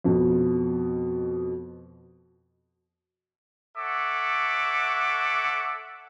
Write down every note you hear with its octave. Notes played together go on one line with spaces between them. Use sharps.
F2 B2
A4 C#5 E5 F#5 D6